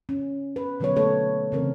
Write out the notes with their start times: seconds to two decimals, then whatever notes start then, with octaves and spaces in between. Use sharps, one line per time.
0.09 C#4
0.56 B4
0.80 B2 D3 F#3 B3 B4 C#5
0.96 A3 A#3 D4 A4 C#5
1.52 C#3 E3 C4 A#4